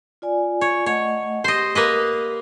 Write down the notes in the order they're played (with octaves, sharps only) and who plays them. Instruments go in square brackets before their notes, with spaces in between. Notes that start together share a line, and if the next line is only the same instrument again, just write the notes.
[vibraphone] F4 D5 G#5
[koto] C#5
[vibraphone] A3 D#5 F#5 [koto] C#5
[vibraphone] G4 [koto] C5 D#5
[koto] A#3 B4 D#5